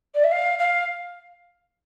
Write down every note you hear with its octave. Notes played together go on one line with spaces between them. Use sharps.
D5
E5
F5
F5